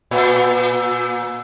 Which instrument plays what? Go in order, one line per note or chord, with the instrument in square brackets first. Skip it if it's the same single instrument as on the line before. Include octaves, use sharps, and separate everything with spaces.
[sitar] A#2